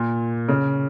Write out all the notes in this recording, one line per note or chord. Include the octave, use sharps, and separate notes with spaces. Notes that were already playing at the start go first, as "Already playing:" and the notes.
Already playing: A#2
C#3